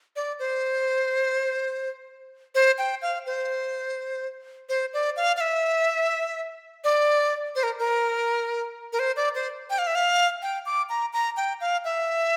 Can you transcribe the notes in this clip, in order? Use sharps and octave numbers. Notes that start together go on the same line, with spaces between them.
D5
C5
C5
G5
F5
C5
C5
D5
F5
F5
E5
D5
C5
A#4
A#4
A#4
C5
D5
C5
G5
F5
E5
F5
G5
D6
A#5
A#5
G5
F5
E5